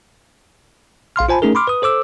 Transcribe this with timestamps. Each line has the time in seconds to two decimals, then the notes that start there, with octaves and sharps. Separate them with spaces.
1.16 A#1 F5 C6 F6
1.29 F4 C5 G#5 A5 B5
1.42 A3 C#4 D#4 G#4 A#4
1.55 B5 C6 D6 F6
1.67 B4 D#6
1.82 A4 C5 D6 E6